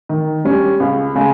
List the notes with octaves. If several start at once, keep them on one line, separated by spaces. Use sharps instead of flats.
D#3
G3 C#4
C#2
C#3 G#3